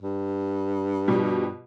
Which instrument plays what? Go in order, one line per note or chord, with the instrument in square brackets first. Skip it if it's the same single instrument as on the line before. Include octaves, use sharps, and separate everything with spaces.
[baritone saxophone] G2
[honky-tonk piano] B2 F3 G3